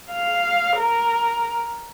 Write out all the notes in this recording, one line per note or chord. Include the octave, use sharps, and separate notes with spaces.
F5
A#4